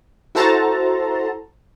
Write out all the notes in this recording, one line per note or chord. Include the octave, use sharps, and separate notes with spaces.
E4 F#4 A4 C5 A5 A#5